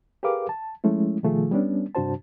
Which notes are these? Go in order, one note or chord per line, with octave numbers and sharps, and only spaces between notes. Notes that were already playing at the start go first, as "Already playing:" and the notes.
G4 G#4 A#4 B4 F5 D6
A5
F3 G#3 A3 C#4 E4
B2 D#3 F3 A3 F4 G#4
G3 B3 C#4 D4
G2 C3 D4 F#4 C5 A5